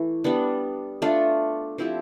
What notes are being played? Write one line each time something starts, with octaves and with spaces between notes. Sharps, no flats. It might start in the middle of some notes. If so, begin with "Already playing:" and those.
Already playing: E3 A3 B4
G3 B3 D4
A3 D4 F4
F3 C4 E4 G4